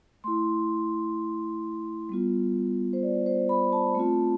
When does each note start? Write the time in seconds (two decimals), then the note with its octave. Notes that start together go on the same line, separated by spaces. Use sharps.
0.24 A3 E4 C6
2.09 G3 B3 F4
2.93 C5
3.03 D5
3.26 C5
3.49 B5
3.73 A5
3.95 A3 C4 F4